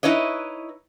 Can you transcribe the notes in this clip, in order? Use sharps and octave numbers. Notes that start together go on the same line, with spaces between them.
D#4 E4 B4 C#5 D#5